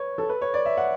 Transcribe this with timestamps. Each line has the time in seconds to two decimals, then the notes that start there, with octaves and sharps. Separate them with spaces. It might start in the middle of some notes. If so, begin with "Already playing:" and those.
Already playing: B4 C#5
0.18 A4
0.29 B4
0.42 C#5
0.54 D5
0.65 E5
0.77 F#5